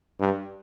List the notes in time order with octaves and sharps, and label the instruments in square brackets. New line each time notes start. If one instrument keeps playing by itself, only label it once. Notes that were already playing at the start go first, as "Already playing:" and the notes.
[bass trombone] G2